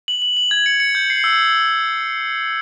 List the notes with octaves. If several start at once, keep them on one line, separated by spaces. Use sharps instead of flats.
F#7
F#7
F#7
G#6
C#7
C#7
G6
C7
E6